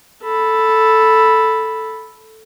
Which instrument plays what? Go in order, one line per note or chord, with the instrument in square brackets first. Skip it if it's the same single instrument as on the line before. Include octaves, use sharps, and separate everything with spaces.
[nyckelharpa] A4 B5